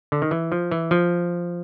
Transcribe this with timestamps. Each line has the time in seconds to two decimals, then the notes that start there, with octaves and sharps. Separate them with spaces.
0.12 D3
0.22 D#3
0.31 E3
0.52 F3
0.71 E3
0.91 F3